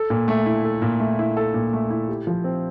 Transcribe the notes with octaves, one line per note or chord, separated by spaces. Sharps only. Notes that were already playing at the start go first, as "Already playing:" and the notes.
Already playing: A4
A#2
A3
E4
A4
A#2
A3
E4
A4
A#2
A3
E4
G4
F3
C4